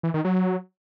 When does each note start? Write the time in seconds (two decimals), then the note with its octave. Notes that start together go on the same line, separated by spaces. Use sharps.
0.03 E3
0.14 D#3
0.25 F#3